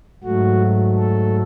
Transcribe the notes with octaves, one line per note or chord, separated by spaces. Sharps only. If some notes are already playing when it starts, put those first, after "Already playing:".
G#2 F#3 A3 F#4
A4